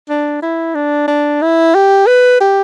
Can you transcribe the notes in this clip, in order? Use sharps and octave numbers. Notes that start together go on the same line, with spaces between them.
D4
E4
D4
D4
E4
G4
B4
G4